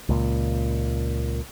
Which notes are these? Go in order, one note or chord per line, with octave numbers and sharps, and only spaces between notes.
C#2 A#2